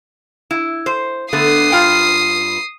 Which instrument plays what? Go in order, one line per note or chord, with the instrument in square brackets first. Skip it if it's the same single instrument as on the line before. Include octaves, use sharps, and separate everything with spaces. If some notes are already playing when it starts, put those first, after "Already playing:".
[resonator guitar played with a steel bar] E4
C5
[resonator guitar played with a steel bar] D3 A3 B3 [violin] D#6 C7
[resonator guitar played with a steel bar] G2 F4 G5